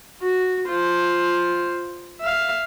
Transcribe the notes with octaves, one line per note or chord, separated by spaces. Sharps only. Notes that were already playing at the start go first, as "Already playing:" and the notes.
F#4
F4 C5
E5 F5